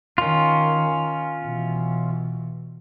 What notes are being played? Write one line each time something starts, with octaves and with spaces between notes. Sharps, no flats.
D#3 C#4 F4
B2 E3